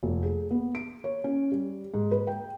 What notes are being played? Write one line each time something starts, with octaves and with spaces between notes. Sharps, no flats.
F1
G#4
B3
D7
C#5
C#4
G3
G#2
B4
G5